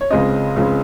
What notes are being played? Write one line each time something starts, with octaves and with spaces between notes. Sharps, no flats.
C#5
C#2 C#3 G#3 C4 D#5
C#2 C#3 G#3 C4